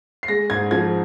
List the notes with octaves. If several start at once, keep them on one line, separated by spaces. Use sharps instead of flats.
C7
G#3 A#6
G#2 G#6
F3 G#6